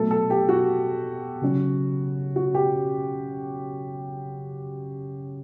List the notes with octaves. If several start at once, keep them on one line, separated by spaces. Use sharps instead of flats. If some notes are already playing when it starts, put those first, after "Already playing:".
Already playing: B2 F#3 A3 A4
A4
G4
F#4
C#3 F#3 C#4
F#4
G4